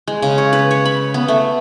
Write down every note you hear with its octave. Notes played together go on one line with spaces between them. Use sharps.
G#3
C#3
C#5
B4
C#5
B5
B3
A3